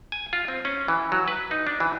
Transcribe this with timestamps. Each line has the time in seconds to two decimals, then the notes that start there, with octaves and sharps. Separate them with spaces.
0.12 G#5
0.33 F4
0.48 C4
0.65 C#4
0.88 E3
1.12 F#3
1.28 B4
1.51 D#4
1.67 D4
1.80 E3